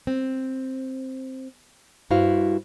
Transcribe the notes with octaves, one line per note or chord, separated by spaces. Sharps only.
C4
G2 E4 F#4 C5 F5